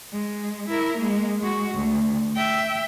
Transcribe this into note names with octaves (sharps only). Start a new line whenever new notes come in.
G#3
E4 A#4
G#3 A#3
G#3 F#4
D2
E5 G5